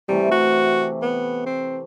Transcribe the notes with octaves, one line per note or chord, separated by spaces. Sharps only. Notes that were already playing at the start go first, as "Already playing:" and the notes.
C3 E3 G3 A3
F#4
B3
C4